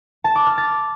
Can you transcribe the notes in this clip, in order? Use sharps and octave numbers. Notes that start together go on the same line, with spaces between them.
A5
D6
F6
A6